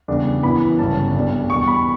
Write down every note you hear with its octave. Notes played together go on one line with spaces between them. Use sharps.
E2 C#3 G3 D4
F#2 E3 B3 E4 B5
G1 F#2 C#3 G3 C#4 A5
B1 B2 G3 D4
E2 B2 G3 C#6
B5